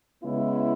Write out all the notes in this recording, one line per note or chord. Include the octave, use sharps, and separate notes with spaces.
C#3 G#3 B3 E4